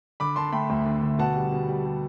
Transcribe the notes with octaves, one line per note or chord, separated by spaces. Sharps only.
D3 B5 D6
D3 A5 C6
A3 G5 B5
D2
D3
D3
B2 F#5 A5
G3
B2
G3
G3